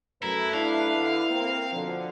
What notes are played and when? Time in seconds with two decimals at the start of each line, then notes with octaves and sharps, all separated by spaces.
0.22 F#2 A3 E4 B4 A#5
0.54 D4 E4 F5
0.97 D3
1.30 A#3 C4 A#4
1.73 B2 D3 F3